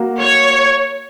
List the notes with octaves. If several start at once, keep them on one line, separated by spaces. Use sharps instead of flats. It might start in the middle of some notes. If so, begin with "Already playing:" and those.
Already playing: A#3 F#4
C#5